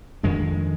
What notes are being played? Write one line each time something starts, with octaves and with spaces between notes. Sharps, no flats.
F2 D#3 G#3 D4